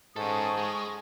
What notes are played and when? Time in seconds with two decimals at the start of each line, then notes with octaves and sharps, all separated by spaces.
0.16 G#2 C#4 A4 G#5 A5 C#6 D#6
0.57 G#3